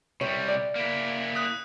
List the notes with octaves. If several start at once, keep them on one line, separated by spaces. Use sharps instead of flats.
C3 G3 C#5
D5
A#3 E4
D#6 F#6